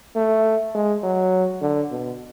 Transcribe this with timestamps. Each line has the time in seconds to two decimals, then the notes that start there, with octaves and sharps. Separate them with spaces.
0.16 A3
0.75 G#3
1.04 F#3
1.62 D3
1.91 B2